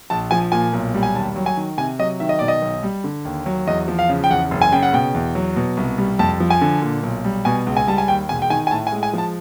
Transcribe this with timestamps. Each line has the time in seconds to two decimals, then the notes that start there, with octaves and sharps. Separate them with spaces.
0.10 A#1 A5
0.31 F3 G#5
0.52 A#2 G#5
0.73 B1
0.94 G3
1.03 G#5
1.15 D#2 A5
1.36 F#3
1.46 G#5
1.57 D#3
1.78 C3 G#5
1.99 F#3 D#5
2.20 D#3 E5
2.29 D#5
2.39 B2 D5
2.48 D#5
2.62 B1
2.83 G3
3.04 D3
3.25 D#2
3.46 F#3
3.67 E2 D#5
3.88 F3
3.99 F5
4.09 C#3
4.24 G5
4.31 E2 F#5
4.51 F#1
4.62 G#5
4.72 C#3 G5
4.83 F#5
4.93 B2 G5
5.14 E2
5.35 F#3
5.56 B2
5.77 C2
5.98 G3
6.19 F2 A5
6.40 F3
6.50 G#5
6.61 D3
6.82 A#2
7.03 B1
7.25 G3
7.45 B2 G#5
7.66 C#2
7.77 G#5
7.87 G3 A5
7.98 G#5
8.08 D#2 G5
8.29 E1 G#5
8.42 G5
8.50 D#3 G#5
8.67 G#5
8.71 A2 A5
8.87 G#5
8.92 G#3
9.03 G#5
9.13 F3 A5